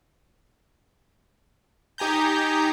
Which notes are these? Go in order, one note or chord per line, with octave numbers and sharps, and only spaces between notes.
D#4 G4 G#5 A#5 G6